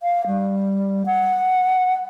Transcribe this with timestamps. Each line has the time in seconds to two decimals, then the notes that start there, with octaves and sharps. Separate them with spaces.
0.03 F5
0.27 G3
1.06 F#5